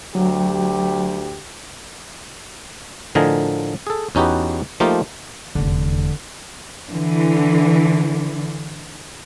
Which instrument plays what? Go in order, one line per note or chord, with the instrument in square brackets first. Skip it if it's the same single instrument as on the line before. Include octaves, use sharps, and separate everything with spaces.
[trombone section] D2 G4 [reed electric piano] F#3
[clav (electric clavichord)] A2 D3 F3 A#4 D#5 G#5
G#4 A4
E2 C#4 D#4 F#4 G4 B4
F3 A3 A#3 D#4 F4 G4
[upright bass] F1 E2 [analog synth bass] D3
[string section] D3 E3